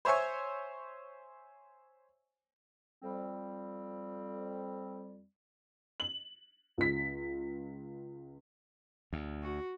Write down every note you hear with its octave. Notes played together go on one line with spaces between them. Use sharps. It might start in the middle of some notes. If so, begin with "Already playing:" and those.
C5 C#5 E5 G#5 C#6
F2 G3 C4
F#7
C#2 B6
D2
F#4